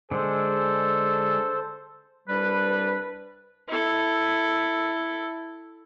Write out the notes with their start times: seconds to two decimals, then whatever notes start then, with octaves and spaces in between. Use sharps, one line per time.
0.11 D3 G#3 A4 C5
2.28 C2 G3 D4 B4
3.68 E4 A4